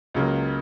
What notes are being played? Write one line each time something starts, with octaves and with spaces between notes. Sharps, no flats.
C#2 C#3 F#3 A#3